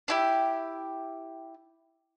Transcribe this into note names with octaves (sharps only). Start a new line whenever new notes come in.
D4 E4 G4